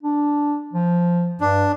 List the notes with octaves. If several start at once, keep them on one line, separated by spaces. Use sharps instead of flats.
D4
F3
G2 D4